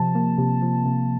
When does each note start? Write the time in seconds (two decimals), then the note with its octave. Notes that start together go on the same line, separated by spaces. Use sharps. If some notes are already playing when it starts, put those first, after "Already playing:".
Already playing: C3 F3 A5
0.15 A#3
0.38 C3
0.62 F3
0.85 C3